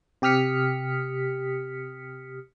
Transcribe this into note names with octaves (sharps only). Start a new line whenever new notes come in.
C3 G4 D#6 F6 B6 C#7